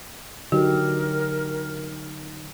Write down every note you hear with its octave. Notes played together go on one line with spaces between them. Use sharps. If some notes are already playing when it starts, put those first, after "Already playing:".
D3 F#3 D#4 F#4 G4 A#4